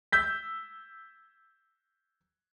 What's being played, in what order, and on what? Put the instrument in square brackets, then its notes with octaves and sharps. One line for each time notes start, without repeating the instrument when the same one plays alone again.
[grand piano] E6 G6 B6